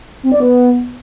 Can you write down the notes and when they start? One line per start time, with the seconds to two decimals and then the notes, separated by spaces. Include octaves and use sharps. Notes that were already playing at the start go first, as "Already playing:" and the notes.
0.23 C4
0.32 D5
0.40 B3